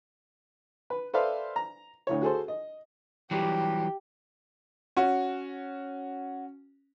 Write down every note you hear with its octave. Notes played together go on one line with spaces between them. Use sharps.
B4
A4 B4 C5 D5 E5 F5
A#5
D2 A2 C#5
F#4 G#4 A4 C5
D#5
E3 F#3 G3 G4
C#4 F#4